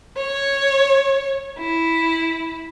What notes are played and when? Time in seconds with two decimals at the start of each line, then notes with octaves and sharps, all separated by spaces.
0.16 C#5
1.59 E4